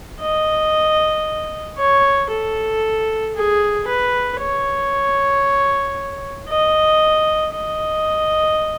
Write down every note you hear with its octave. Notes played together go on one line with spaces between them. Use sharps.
D#5
C#5
A4
G#4
B4
C#5
D#5
D#5